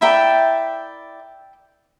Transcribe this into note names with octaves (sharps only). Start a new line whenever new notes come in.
E4 A#4 D5 E5 G5